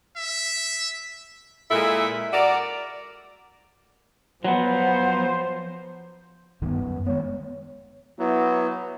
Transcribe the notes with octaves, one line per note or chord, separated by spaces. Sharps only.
E5
A#2 G#3 E4 A4 E5
F#4 A#4 D5
F3 F#3 B3 C5
C#2 G2 D#3 B3
F#2
D#3 G#3 B3 C#5
F#3 B3 E4